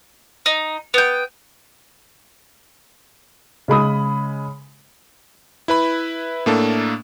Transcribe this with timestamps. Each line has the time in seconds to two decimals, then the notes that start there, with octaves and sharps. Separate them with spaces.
0.46 D#4
0.94 B3 G5
3.68 C#3 G#3 B5 D#6
5.68 E4 B4 B5
6.46 A2 A3 A#3 D4 A4